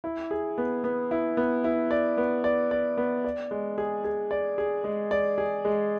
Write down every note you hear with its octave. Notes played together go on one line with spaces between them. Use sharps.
E4
G#4
B3
B3
E4
B3
E4
D5
B3
D5
D5
B3
D5
G#3
G#4
G#4
D5
G#4
G#3
D5
G#4
G#3